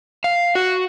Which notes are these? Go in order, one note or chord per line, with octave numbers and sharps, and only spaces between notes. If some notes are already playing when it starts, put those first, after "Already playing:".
F5
F#4